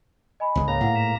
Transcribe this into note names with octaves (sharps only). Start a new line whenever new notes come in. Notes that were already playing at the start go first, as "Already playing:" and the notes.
D#5 G#5 B5
C#2 G#3
G#2 A#3 C#5 A#5
A2 F5 F#5
A#6 B6 E7